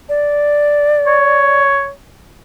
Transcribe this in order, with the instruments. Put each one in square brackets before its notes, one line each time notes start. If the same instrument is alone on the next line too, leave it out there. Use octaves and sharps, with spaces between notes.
[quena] D5
[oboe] C#5